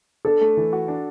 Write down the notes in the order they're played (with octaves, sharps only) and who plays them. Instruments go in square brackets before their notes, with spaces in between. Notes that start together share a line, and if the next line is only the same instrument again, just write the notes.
[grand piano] D4 [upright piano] A4
[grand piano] A3
E3
F#4
D4